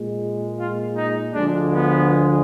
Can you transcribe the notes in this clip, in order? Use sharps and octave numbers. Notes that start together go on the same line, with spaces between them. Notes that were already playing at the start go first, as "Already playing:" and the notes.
Already playing: A#2 G#3
F4
D#4
D2 D3 F3 G#3 D4
B3